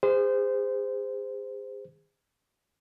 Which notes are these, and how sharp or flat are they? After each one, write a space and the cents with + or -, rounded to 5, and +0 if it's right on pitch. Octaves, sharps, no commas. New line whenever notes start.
G#4 -35 C5 -20